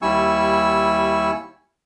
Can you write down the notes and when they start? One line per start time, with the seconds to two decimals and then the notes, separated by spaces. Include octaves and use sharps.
0.02 D#2 G3 E4 G#5 C#6 E6